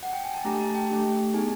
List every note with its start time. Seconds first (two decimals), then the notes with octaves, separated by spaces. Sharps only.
0.03 F#5
0.13 G5
0.24 G#5
0.34 A5
0.45 A3 D4 G4 A#5
0.60 A5
0.75 G5
0.90 A3 D4 G4
1.34 B3 D#4 G#4 G#5